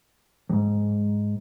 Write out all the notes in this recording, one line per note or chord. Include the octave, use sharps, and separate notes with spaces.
F2 G#2